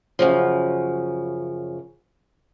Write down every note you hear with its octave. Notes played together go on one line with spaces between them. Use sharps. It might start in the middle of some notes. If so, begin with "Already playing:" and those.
F#2 C#3 F3